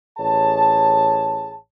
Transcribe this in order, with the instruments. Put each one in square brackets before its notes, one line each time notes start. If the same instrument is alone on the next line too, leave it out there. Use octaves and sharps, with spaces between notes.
[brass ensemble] A1 G#4 C#5 A5